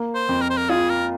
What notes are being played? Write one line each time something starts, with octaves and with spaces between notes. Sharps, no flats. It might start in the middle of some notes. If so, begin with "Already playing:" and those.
Already playing: A#3
C5
F2
A#4
C5
A#4
F4 G#4
A#4